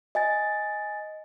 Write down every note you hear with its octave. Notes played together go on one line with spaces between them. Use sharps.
D#5 G#5 A6